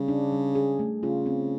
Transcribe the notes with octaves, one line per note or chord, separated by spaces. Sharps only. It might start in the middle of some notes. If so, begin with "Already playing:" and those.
Already playing: C#3 G3
D4
G3
G#4
A3
C#3 F4
C4